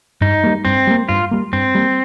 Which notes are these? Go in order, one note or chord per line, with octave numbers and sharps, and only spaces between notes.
G2 D#4
G3 A#3
G2 C4
G3 A#3
G2 F4
G3 A#3
G2 C4
G3 A#3